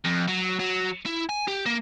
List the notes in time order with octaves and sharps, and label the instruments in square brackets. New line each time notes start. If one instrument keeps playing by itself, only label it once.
[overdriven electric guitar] F2
F#3
F#3
E4
G#5
G4
A#3